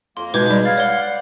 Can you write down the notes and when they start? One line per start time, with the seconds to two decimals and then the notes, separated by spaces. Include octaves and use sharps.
0.17 F2 A#3 C6
0.34 B2 G#3 D#4 B4 D6 G6 G#6
0.50 G3 B5
0.65 F5 G#6 A6
0.77 C#5 D5 F#5 G7